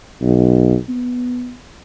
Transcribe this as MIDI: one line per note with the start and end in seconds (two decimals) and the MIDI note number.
0.22 0.76 35
0.88 1.55 59